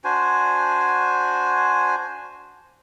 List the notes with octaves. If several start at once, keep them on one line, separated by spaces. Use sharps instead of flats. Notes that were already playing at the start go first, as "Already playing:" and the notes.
D4 F#4 C5 G#5